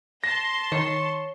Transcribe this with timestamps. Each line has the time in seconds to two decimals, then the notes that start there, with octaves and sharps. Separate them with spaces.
0.24 A5 C6 A#6
0.72 D#3 C#5